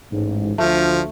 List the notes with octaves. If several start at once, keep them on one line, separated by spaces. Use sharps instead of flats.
A1 G#2
D2 F3 A3